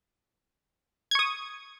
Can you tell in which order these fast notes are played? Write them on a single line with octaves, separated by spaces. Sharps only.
G#6 C#6 D#6